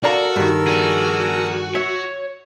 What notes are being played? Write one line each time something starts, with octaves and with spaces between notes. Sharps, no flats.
F#4 A4 A#4 D5 F5 A#5 E6
G2 D#3
F#4 G#4 D5
C#5 E5